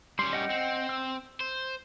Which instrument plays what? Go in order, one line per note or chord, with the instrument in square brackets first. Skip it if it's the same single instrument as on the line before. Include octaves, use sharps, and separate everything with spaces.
[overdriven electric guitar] G3 C#4 [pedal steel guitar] C6
[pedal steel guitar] D#5 F#5 G5
[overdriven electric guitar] C4
[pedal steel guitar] E6
[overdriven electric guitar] C5